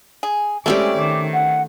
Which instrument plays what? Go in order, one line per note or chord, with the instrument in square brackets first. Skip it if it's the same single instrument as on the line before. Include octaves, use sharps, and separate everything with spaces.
[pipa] G#4
[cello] G#3 D5 [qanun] A3 C#4 G4 [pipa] C4 E4
[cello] D#3 [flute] D6
[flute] F#5